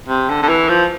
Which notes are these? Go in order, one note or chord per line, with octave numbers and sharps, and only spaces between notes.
C3
D3
D3
E3
F3